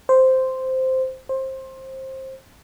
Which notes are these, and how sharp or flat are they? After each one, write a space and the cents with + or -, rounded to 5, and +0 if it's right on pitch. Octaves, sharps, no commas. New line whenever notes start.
C5 -5
C5 +20